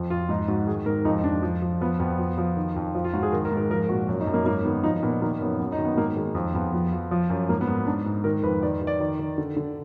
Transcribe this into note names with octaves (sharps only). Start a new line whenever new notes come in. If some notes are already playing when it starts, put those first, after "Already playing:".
Already playing: F2 F3
F2 F4
G#2 D#4
G#2 F#4
D#3 G#4
G#2 A#4
F2 D#4
F2 D4
F3
F3
F3 B3
F2 B3
F3
F3
D#3
F2
F3
F4
G#2 F#4
G#4
D#3 A#4
A#4
G#2
A#4
F3 A#4
A#2 F#4
F#2 F#4
D#4
F#2
A#3
G#2 A#3
D#3 B3
F3 D#4
A#2 B3
D#3 A#3
F#2 B3
F#2 B3
D#4
D#3
B3
G#2 A#3
D#3 G#3
F2
F2 B3
F3
F3
F3
F#2
G#2 A#3
B3
G#2
G#2 D4
G#2
D#3 A#4
F2 B4
D#3 D5
D#3
D5
D#3 D5
D#3
D3
D3